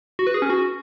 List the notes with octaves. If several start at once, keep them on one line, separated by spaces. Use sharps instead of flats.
F#4
B4
G#4
C#4
F#4